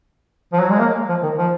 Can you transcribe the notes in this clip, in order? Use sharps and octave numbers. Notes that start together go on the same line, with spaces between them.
F3
F#3
G#3
A#3
F3
D#3
F3